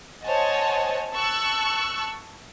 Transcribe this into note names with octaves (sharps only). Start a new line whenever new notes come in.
C5 C#5 D#5 F#5 G#5 A5
A5 C#6 E6 F#6